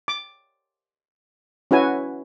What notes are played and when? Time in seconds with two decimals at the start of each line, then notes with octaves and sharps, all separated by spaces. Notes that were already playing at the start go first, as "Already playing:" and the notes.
0.08 D6
1.71 C#4 E4 F#4 B4 G#5